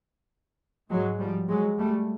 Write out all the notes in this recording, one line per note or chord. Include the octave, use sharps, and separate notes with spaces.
G#2 F#3 G#3
F3 G3
F#3 G#3
G3 A3